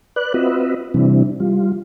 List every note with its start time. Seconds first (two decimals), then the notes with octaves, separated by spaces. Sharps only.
0.16 B4 D5 F#6
0.34 C4 F4 F#4 B4 D#5 E5
0.94 C3 E3 G3 C4 D4 E4
1.40 G3 F4